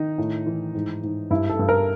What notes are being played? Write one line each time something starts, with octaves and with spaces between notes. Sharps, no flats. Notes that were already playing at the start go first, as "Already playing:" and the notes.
Already playing: D#3 D#4
A2
E3
G#2
G#2
G2 E4
A4
G2
A#4